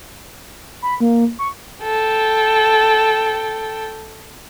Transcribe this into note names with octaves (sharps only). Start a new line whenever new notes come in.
B5
A#3
C#6
A4 G5